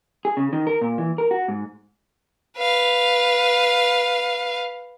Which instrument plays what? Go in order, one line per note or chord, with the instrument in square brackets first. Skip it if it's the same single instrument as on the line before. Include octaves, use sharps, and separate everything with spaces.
[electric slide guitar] G#4
C#3
D#3
A#4
A#2
E3
A#4
F#4
G#2
[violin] B4 F5